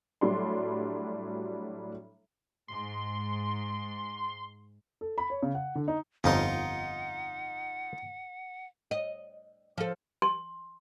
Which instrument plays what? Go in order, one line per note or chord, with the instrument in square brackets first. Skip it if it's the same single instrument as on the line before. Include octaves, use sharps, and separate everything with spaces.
[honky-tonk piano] A2 F#3 G3 D4 C6
[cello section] G#2 [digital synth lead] C6
[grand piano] A4
B5
C#5
C#3
F#5
D3
D#4
[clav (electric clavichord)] G1 F2 [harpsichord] D#4 F4 [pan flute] F#5
[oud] D#5
F3 A4
[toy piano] C6